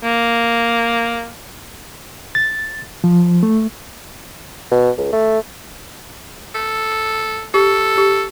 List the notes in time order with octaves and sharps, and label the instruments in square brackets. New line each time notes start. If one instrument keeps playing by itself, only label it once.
[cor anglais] A#3
[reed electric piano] A6
F3
A3
[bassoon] B2
C#2
A3
[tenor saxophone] A4
[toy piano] G4 [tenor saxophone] A4
[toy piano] G4